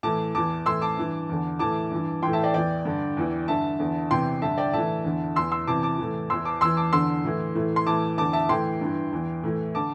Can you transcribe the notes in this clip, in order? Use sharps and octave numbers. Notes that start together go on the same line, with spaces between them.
A2 E3 A5 D6
E2 E3 A5 D6
A2 E3 C6 E6
A5 D6
G2 E3
E2 D3
A2 E3 A5 D6
G2 E3
A2 E3 G5 C6
E5 A5
D5 G5
E2 E3 D5 G5
G2 D3
E2 E3
G2 D3 E5 A5
E2 D3
E2 C3 E3 G5 C6
G2 D3 E5 A5
D5 G5
A2 E3 E5 A5
E2 D3
E2 E3 C6 E6
C6 E6
E2 C3 E3 A5 D6
A5 D6
A2 E3
E2 E3 C6 E6
A5 D6
E2 E3 C6 E6
A5 D6
E2 D3 C6 E6
A2 E3
A2 E3
C6
A2 E3 A5 D6
E2 D3 A5 D6
E5 A5
A2 E3 G5 C6
G2 E3
E2 E3
A2 E3
D3 A5 D6